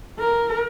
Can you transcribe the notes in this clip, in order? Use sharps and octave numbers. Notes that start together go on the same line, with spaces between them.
A#4